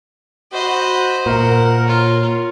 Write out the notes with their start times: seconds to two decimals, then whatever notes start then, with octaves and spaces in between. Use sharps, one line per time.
0.53 F#4 C5 D#5 B5
1.26 A#2 A#4 F#5
1.87 F4 C#5